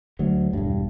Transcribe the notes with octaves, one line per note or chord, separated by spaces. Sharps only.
D2 F#3
E1 G2